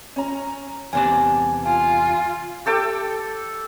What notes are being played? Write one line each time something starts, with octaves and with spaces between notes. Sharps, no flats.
C#4 A#5
E2 C3 D4 G#5
F4 G#5
G4 A4 G5 D6